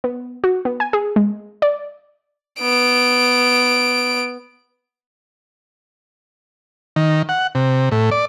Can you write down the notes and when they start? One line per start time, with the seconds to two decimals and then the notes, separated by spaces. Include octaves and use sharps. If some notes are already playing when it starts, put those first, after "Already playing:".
0.04 B3
0.44 F#4
0.65 B3
0.80 G#5
0.93 G#4
1.16 G#3
1.62 D5
2.60 B3 D7
6.96 D#3
7.29 F#5
7.55 C3
7.91 A2
8.11 D5